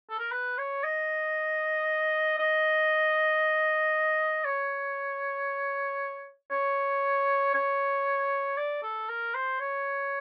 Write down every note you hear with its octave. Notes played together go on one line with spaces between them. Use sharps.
A4
A#4
B4
C#5
D#5
D#5
C#5
C#5
C#5
D5
A4
A#4
C5
C#5